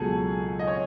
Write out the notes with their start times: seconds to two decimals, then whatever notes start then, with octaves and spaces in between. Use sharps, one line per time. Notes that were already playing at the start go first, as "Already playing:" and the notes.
Already playing: C#2 B2 F#3 G#4 A4
0.59 D#5
0.67 C#5